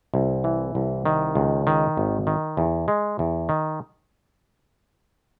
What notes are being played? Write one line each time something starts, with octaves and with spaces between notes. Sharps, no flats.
C2
E3
C2
D#3
C#2
D#3
G#1
D#3
E2
G#3
E2
D#3